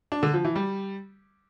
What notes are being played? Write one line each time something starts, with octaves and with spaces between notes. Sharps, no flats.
D4
D3
F3
E3
G3